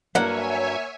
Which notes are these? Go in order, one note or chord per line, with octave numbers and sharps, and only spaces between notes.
G2 F#3 A#3 C#5 E5 F#5 G#5